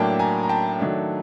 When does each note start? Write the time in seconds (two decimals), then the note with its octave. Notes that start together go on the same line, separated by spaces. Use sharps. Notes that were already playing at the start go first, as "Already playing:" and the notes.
Already playing: A2 F#3 A#3 D4 G5 A5
0.19 G#5 A#5
0.43 A#5
0.49 G5 A5
0.79 D#3 F#3 A3 D4